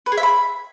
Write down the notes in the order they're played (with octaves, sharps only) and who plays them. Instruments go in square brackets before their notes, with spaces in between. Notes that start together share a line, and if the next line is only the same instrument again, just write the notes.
[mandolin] B4
G#4
E5
B5